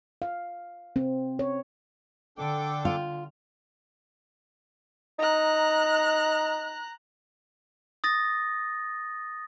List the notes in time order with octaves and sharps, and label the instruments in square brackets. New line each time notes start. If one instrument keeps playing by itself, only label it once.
[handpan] F5
C4
C#5
[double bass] D3 [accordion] D4 A4 D6 [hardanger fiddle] G5
[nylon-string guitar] F4
[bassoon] D#4 [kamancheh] A#5 F#6
[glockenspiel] D#6 A6 A#6